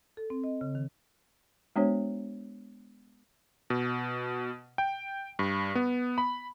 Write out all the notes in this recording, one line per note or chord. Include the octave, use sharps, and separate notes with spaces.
A4
C4
D#5
C#3
D#3
G#3 B3 D4 F#4 C5 C#5
B2
G5
G2
B3
B5